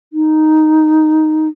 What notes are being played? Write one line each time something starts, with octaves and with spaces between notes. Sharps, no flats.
D#4